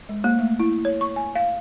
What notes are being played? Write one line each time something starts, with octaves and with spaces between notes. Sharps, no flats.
G#3
A#3
A3
E4
C#5
C#6
G#5
F5